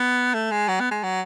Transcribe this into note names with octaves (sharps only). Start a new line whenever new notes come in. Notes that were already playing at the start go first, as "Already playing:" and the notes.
Already playing: B3
A3
G#3
F#3
B3
G#3
F#3